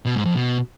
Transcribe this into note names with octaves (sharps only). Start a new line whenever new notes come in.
B2
G#2
F2
B2